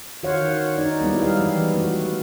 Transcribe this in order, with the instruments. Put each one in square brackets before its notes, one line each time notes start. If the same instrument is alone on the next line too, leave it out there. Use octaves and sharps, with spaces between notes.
[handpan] D#3 F#4 C5 C#5 F5 F#5
D#4 D5
G3 G#3 B3 E4
G4 F5
E3
A3 F#4